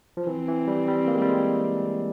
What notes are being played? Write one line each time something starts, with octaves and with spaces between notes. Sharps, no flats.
F3
E3 C4
E3
G3
G3
A#3
G#3
G3
G#3